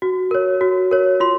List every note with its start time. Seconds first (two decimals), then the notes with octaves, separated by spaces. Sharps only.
0.02 F#4
0.31 A#4 C#5
0.61 F#4
0.91 A#4 C#5
1.20 F4 C6